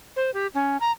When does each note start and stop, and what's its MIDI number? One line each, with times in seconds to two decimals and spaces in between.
0.16 0.31 72
0.34 0.47 67
0.54 0.77 61
0.81 0.92 82